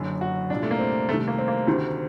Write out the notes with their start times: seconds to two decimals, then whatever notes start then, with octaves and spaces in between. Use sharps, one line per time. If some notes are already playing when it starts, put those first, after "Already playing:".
Already playing: F#1 F#2 D3
0.21 F#4
0.50 C2 A#2 D4
0.63 A3
0.71 A#3
0.79 C4
1.09 C2 C3 D#3 A3
1.28 A#3
1.38 C4
1.48 A#3
1.67 D2 C3 D#3 C4